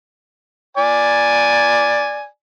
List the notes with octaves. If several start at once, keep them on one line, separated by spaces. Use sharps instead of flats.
D5 G#5